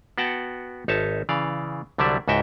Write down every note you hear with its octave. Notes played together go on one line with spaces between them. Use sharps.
B3 F#4 F#5 G5 A5
G#1 D#4 C#5 E5 A5
C#3 E3 D5 F5
C2 D3 F#3 G3 D5 E5
C#2 G#2 F#4 E5 G5